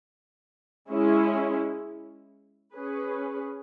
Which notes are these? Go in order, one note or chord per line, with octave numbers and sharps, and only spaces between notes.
G#3 C#4 E4
C#4 G#4 B4